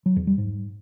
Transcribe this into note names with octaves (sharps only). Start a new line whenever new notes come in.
F#3
E2
G3
G#2